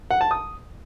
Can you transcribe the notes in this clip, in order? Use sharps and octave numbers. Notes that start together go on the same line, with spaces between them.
F#5
A5
D#6